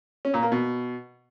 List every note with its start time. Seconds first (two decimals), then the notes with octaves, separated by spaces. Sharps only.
0.25 C#4
0.34 A#2
0.43 A#3
0.52 B2